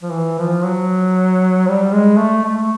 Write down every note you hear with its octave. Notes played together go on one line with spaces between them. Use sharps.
F3
E3
F3
F#3
G3
G#3
A3
A3